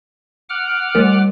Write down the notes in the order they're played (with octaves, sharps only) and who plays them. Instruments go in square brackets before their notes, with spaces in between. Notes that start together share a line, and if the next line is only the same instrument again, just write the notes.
[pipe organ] F#5 D6 F6
[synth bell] G3 A3 A#4